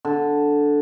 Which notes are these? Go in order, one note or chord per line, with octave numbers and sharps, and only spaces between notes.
D3